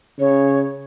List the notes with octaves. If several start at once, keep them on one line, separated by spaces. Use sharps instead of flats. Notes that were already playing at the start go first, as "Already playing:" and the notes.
C#3 C#5